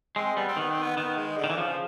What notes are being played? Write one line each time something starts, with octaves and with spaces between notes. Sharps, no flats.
G#3 C4
G3 B3
C4
D#3 B3
C4
B3
D#3 B3
G#3
D3
D#3
E3
C#3 F3